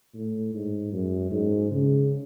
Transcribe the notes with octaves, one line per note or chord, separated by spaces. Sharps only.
A2
G#2
F#2
G#2
C#3